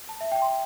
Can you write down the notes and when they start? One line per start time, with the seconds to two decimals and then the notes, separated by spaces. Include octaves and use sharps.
0.09 A5
0.21 E5
0.32 G5
0.42 C6